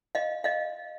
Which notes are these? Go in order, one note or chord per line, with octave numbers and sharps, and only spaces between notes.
D#5 F5
D#5 F5